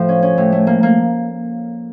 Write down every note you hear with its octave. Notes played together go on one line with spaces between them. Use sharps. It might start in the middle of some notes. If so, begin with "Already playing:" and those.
Already playing: A2 F3
C#4
C#4
A2
A3
A#3
A#3